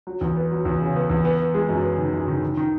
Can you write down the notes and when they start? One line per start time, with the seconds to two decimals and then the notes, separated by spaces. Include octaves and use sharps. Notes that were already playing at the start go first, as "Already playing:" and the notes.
0.07 F#3
0.21 E2
0.37 B3
0.52 F#3
0.65 E2
0.81 C#3
0.96 B3
1.10 E2
1.25 B3
1.39 B3
1.54 G#3
1.69 F#2
1.83 B3
1.98 D#3
2.14 F#2
2.28 D#3
2.43 D#3
2.57 D#3